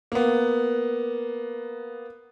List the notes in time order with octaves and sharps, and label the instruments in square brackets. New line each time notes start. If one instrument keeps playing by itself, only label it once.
[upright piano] A#3 B3